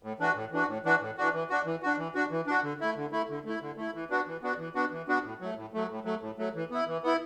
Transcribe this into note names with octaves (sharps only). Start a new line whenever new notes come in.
A2
E3 D4 F#4
A2
E3 D4 F#4
A2
E3 D4 F#4
A2
E3 D4 F#4
E3
D4 F#4
E3
D4 F#4
E3
D4 F#4
E3
D4 F#4
D3
A3 E4
D3
A3 E4
D3
A3 E4
D3
A3 E4
E3
B3 D4 F#4
E3
B3 D4 F#4
E3
B3 D4 F#4
E3
B3 D4 F#4
A2
F#3 A3
A2
F#3 A3
A2
F#3 A3
A2
F#3 A3
E3
B3 E4
E3
B3 E4